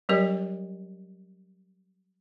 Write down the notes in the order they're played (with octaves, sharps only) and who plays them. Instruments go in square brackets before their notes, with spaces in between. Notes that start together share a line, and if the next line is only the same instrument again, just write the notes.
[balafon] F#3 G3 C#4 G4 A#4 D#5